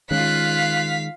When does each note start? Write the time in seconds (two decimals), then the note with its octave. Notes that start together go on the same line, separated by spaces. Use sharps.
0.11 D#3 G#3 C#4 F4 F5 F#6 B6